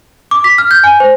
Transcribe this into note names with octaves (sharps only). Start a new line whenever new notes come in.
D6
B6
F6
G6
G#5
C5